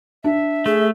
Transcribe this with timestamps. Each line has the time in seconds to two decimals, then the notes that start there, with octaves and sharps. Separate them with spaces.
0.24 D4 E5
0.66 A3 G#4